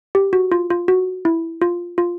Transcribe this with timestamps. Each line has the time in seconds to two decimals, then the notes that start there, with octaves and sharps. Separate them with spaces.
0.15 G4
0.33 F#4
0.52 F4
0.70 F4
0.88 F#4
1.25 E4
1.62 F4
1.98 F4